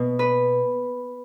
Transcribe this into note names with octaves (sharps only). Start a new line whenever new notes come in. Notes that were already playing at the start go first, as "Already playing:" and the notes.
Already playing: B2
B4